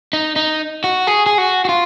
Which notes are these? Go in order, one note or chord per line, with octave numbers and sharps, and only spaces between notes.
D#4
D#4
F#4
G#4
G#4
F#4
F#4
F4